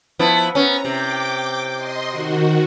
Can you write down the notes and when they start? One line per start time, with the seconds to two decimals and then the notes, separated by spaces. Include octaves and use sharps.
0.19 F3 B3 E4
0.55 B3 C#4 A#5
0.85 C3 G5 D6
1.74 D#5 C6
2.08 D#3 F#4